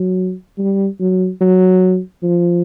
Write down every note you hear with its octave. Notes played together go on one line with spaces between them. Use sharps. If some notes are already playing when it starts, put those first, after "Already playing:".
Already playing: F#3
G3
F#3
F#3
F3